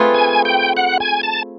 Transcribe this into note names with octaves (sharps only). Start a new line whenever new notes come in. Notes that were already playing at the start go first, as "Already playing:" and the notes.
Already playing: A3 C4 F4 G#4 B4
G#5
G5
F#5
G#5
A5